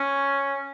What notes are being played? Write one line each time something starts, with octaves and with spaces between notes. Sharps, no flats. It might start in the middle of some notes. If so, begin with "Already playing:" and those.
Already playing: C#4